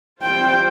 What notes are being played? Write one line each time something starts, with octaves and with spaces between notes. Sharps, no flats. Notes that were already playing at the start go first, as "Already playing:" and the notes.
G3 C4 F4 C5 G5